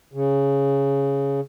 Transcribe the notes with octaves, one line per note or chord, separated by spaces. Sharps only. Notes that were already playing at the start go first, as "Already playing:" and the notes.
C#3